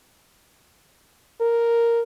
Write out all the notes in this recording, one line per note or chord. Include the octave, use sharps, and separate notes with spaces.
A#4